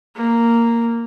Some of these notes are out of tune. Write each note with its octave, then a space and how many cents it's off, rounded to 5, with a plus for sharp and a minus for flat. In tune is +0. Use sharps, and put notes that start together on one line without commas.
A#3 -5